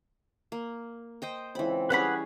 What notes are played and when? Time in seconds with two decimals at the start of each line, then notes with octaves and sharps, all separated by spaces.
0.52 A#3
1.22 C5 D#5 G5
1.55 C#2 E3 C4 B5
1.90 G3 C#4 G#4 B4 F#5 B5